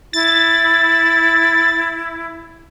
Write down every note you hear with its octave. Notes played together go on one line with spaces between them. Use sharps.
E4 A6